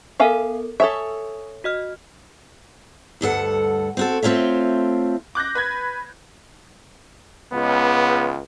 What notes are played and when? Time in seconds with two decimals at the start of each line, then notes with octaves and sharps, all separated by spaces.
0.20 B3 A4 A#4 E5 F5 G#5
0.80 A4 C#5 E5 G#5 C#6 D#6
1.64 F#4 D#5 F6
3.21 D2 G2 A4 F#5
3.97 C4 F#4 A4
4.22 A3 C4 F4 C#5 E5
5.35 D6 F#6 G6 A#6
5.55 B4 B5 G#6
7.53 C#2 B3